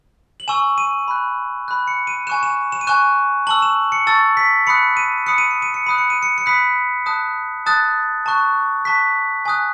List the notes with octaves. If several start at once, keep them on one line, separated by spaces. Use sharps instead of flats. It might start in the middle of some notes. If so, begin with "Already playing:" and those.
F#7
G#5 C#6 E6 E7
D#7
B5 F#6
B5 F#6
C#7
D#7
G#5 C#6 F#6 E7
E7
E7
D#7
G#5 C#6 F#6 E7
A5 C#6 E6 F#7
E7
C#7
A5 C#6 E6 A6
B6
B5 D#6 F#6 C#7
D#7
B5 D#6 F#6 C#7
D#7
C#7
D#7
C#7
B5 D#6 F#6 D#7
C#7
D#7
C#7
C#7
B5 D#6 F#6 B6
A5 D#6 F#6
A5 D#6 F#6 A6
A5 C#6 F#6
A5 C#6 F#6 B6
G#5 D#6 F#6